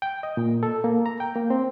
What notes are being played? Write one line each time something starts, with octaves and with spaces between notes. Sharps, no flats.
G5
D#5
A#2
A4
A#3
A#5
G5
A#3
C4